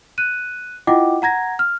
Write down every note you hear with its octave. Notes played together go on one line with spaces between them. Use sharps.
F#6 D#7
E4 F4 D#5 F#5 G5 D6
F#5 A#5 G#6 A#6
F6